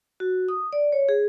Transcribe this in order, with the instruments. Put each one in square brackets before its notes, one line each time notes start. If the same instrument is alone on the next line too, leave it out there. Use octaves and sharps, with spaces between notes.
[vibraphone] F#4
D#6
D5
C#5
G#4